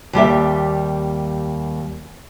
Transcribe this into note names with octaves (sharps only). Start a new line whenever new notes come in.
D#2 G3 G4 E5